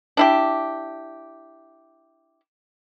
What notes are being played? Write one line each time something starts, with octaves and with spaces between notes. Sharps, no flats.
D4 E4 G4